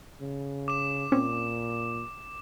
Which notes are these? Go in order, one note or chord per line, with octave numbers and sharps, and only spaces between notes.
C#3
D6 E7
A#2 C4 C#4